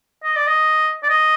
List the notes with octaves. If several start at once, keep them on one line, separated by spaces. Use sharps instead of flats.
D#5
D5
D#5
D5
D#5